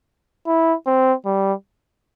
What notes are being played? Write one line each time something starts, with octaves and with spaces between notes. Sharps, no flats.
E4
C4
G3